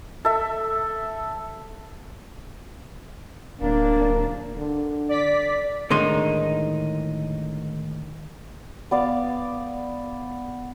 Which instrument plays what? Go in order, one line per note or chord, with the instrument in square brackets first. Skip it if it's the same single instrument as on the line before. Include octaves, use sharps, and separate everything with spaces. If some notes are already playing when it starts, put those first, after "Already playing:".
[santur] A4 E5
[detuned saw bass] D1 [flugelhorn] A#3 [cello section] D4
[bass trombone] D3
[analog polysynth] D5 B6
[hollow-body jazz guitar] A2 D3 D#3 G#3 D#4 C6
[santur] B3 D5 F5